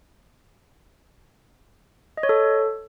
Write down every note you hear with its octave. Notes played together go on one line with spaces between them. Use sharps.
D#5
C#5
A4